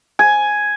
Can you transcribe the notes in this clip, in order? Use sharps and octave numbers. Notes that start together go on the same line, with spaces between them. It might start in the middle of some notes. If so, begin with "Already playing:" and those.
G#5